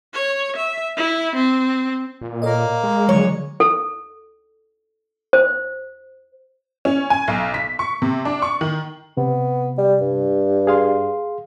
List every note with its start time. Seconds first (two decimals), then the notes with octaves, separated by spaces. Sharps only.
0.14 C#5
0.56 E5
0.97 E4
1.35 C4
2.22 A#2
2.42 A#3 A4 C#5 D#5
2.84 G#3
3.09 D3 F3 F#3 C#5
3.60 A4
5.33 C5
6.85 C#4
7.10 G#5
7.28 B1
7.54 B6
7.79 C#6
8.02 C3
8.25 D4
8.42 C#6
8.61 D#3
9.17 C3 B3
9.78 G3
10.01 G2
10.67 G#4 F5 C6